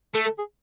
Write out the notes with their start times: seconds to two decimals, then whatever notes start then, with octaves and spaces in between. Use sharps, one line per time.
0.14 A3 A4
0.25 A4
0.38 G#4